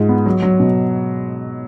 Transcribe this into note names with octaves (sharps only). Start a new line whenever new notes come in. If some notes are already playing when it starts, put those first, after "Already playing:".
Already playing: G#2 G#3 F4
B3
F#3
F#3
B2